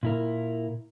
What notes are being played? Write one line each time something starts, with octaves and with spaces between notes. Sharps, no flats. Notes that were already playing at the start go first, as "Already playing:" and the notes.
A#2 E4 A#4